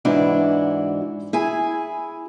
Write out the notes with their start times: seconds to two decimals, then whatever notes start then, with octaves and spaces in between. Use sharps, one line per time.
0.05 G#2 E3 D4 E4 F#4
1.33 E4 G#4 G#5